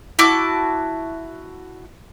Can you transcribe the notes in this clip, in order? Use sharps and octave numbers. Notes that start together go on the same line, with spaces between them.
E4 F#4 A5 D6